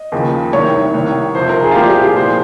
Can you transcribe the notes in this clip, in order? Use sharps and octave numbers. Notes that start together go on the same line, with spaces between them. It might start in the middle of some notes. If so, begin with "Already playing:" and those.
Already playing: D#5
D#2 C#3 F3
C2 C3 D#3 C#5
C2 C3 D#3
F2 C3 F3 C5
A#4
G#4
F4
C2 A#2 F3 G4
G4
G#4
C2 A#2 F3 C5